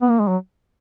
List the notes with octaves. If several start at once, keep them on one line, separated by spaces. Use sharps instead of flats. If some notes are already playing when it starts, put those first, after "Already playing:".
B3
A#3
G#3
F#3